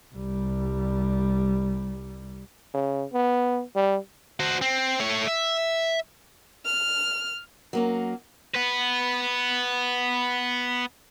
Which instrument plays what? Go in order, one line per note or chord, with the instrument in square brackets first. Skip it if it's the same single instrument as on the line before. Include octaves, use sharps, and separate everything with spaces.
[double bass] C2 G3
[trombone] C#3
B3
G3
[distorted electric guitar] F#4 C5
C4
A3 C#5
E5
[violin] F6
[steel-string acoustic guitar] F#3 A#3 C#4
[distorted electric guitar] B3 B4